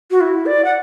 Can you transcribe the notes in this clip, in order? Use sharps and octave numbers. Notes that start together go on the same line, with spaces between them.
F#4
E4
D5
F#5